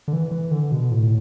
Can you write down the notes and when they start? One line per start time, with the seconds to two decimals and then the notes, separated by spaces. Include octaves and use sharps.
0.08 D3
0.13 E3
0.32 E3
0.51 D3
0.72 B2
0.91 A2